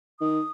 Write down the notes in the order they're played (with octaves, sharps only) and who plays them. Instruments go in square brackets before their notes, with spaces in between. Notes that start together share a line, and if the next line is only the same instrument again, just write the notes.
[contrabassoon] D#3 [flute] D#6